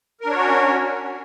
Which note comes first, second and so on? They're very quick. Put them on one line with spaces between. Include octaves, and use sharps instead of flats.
A#4 D4 C#5 F#4 C#4